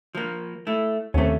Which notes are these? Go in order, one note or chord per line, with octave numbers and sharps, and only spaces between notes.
F3 A#3
A3 E4
D#2 C3 A3 C#4